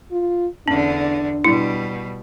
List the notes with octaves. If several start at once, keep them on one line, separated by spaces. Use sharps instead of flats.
F4
E2 D3 C#4 D4
B2 G3 E4